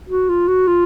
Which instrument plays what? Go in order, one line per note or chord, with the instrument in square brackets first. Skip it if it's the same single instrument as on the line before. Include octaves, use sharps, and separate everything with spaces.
[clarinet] F#4
F4
F#4
F4